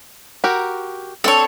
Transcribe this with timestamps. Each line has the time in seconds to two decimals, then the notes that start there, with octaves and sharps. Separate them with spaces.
0.44 F#4 G4 A#4
1.24 C4 D4 A4 C#5